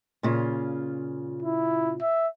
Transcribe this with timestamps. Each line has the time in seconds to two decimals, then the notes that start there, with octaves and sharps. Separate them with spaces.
0.23 A#2 C#3 F4
1.43 E4
2.02 E5